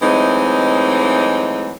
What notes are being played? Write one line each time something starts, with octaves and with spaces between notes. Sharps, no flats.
E3 F#3 G#3 A3 C4 D#4